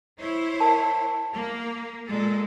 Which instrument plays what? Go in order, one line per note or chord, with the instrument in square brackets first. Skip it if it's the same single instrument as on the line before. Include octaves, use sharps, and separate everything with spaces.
[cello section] E4 C5 C#5
[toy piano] A#4 A5
[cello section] A#3
A#2 G#3 A4